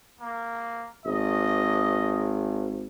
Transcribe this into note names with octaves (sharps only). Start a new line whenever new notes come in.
A#3
G#1 D#5